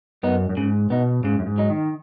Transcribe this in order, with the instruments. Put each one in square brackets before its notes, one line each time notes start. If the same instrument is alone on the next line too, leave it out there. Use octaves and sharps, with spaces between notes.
[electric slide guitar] F#2 [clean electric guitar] B3 D#4
[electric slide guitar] F#2
[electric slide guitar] G#2 [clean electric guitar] C#3
[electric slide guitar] B2 [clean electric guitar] B3 D#4
[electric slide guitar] G#2 [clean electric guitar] C#3
[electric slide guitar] F#2
G#2
[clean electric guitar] F#3 D#4
[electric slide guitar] D#3